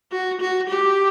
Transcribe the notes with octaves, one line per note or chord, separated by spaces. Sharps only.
F#4
F#4
G4